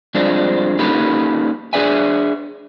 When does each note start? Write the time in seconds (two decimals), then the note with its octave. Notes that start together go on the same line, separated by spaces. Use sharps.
0.14 G2 F3 G#3 C4 D4
0.79 A#3 C#4 D#4 G4 A4 B4
1.73 D4 G#4 B4 D5 E5 G#5